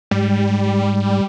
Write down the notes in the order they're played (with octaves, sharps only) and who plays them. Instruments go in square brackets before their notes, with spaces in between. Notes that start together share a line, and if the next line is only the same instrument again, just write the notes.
[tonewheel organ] G#2 [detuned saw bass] G3